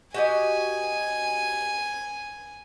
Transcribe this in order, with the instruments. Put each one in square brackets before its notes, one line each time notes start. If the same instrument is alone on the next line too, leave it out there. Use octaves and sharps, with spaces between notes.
[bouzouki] F#4 G4 D#5 [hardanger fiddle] G#5